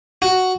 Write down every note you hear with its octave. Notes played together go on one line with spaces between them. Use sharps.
F#4